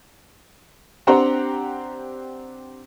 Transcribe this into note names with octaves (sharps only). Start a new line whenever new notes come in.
C4 D4 G4 C5 F#5 A#5